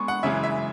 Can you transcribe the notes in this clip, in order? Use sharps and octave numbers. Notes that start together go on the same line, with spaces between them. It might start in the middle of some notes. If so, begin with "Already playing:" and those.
Already playing: G#3 B3 C#6
F#5
F#2 C#3 E3 G#3 E5
E5